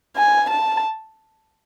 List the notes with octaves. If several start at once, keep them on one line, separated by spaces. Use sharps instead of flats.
G#5
A5